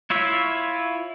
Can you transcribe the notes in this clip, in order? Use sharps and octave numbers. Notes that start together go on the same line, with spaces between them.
E4 F4 C#5 E5